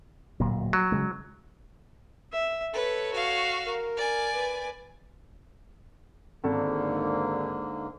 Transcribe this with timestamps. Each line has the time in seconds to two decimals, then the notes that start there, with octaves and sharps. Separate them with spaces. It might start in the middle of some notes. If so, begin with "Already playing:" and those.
0.40 D1 A#2 F#3
0.73 F#3
0.92 C#3 G#3
2.32 E5
2.74 A4 B4 C#5
3.14 F#4 F5
3.65 A#4
3.97 D5 G#5
4.34 B4
6.44 G#1 G#2 D3 A#3 A4